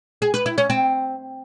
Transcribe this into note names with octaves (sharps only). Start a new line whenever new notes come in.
G#4
B4
E4
C#4
C4